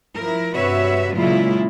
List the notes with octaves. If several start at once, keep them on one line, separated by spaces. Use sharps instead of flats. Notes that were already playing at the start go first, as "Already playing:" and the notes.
F3 E4 A#4
G2 C3 F#4 B4 C#5 E5
A#2 C#3 F#3 G#3 E4 F4